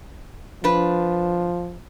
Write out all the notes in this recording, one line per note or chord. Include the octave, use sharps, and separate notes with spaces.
F3 D4 B4